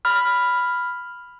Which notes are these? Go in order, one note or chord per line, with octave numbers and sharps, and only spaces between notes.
B5 F6